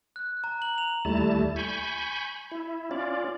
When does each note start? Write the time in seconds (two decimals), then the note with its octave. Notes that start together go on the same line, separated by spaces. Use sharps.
0.16 F#6
0.44 A#5
0.62 F#7
0.78 F7
1.05 D#2 G3 A3 E4 A5
1.56 G#5 B5 C#6 G6
2.52 E4
2.91 C#4 F4 D5